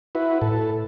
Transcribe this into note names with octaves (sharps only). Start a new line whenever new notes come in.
E4 F#4 B4
A2 A4